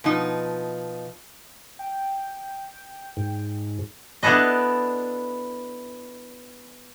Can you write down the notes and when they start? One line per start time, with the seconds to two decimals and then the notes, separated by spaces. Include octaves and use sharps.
0.04 B2 F3 D#4
1.79 G5
3.17 G#2
4.23 B3 D4 E4 A4 B4 D#5